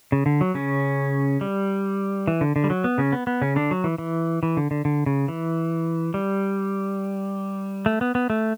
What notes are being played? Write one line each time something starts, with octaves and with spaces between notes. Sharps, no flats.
C#3
D3
F#3
C#3 C#4
G3
E3
D3
D3
G3
F#3
B3
C#3 C#4
B3
B3
C#3 C#4
D3 D4
F#3
E3
E3
E3
D3
D3
D3
C#3
E3
G3
A3
B3
B3
A3